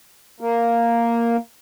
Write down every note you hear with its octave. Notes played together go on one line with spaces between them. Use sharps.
A#3